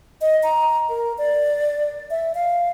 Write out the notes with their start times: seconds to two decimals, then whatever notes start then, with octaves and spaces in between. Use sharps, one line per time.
0.21 D#5
0.43 A#5
0.89 A#4
1.18 D5
2.10 E5
2.35 F5